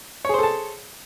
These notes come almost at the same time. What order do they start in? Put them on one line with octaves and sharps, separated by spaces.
C#5 G#4 C5 A4 A5